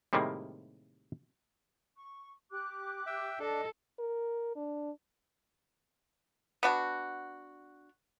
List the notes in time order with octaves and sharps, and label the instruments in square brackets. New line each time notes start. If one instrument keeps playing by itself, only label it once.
[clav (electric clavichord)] A2 C3 D#3 G3 G#3 A#3
[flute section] C#6
G4 D6 F#6
[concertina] E5 G5
[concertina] D4 [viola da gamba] A4 [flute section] D#5
[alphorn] A#4
D4
[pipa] B3 D4 F#4